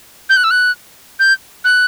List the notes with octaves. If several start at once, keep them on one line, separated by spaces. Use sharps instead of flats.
G6
F#6
E6
F#6
G6
F#6